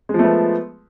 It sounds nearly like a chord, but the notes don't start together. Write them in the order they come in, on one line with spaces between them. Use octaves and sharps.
G#3 F3 A3 B3